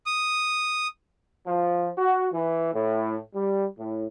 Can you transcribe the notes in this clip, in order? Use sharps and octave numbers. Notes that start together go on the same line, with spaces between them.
D#6
F3
F#4
E3
A2
G3
A2